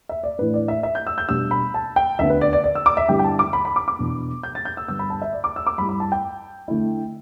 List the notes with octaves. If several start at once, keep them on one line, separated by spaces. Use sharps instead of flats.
E5
D5
A2 E3 A3 D4 B4
D5
E5
E5
G6
E6
G6
B2 G3 D4 E6
B5
A5
G5
D2 D3 B3 E5
B4
D5
D5
D5
E6
D6
E5
G2 D3 G3 B3 E4 G5
G5
A5
D6
B5
B5
D6
D6
E2 B2 B3 D4
G6
A6
G6
E6
G2 D3 B3 E6
B5
A5
E5
D5
D6
E6
D6
G2 G3 E4 B5
B5
A5
G5
D3 A3 E4